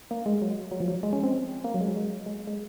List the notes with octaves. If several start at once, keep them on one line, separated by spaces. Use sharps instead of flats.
A#3
G#3
F#3
F#3
F3
F#3
G#3
C#4
C4
A#3
F#3
G#3
F#3
G#3
G#3
G#3